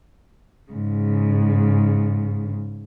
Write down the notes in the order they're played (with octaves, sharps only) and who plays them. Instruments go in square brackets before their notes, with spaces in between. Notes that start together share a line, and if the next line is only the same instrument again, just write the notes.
[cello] G#2 C#3